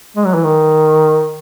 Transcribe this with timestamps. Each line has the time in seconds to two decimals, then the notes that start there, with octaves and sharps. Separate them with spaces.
0.16 G#3
0.26 F#3
0.34 E3
0.44 D#3